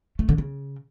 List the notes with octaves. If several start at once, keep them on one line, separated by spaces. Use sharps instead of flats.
A3
D3
C#3